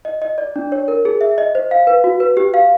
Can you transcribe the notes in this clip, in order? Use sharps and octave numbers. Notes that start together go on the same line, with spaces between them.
D#5
D#5
D5
D4
C#5
A#4
G#4
E5
D#5
C5
F5
B4
F#4
B4
G4
F5